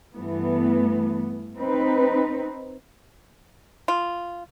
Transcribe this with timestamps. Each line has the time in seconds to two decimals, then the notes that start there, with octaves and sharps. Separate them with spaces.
0.16 G2 E3 A3 B3
1.56 C4 D#4 B4
3.88 F4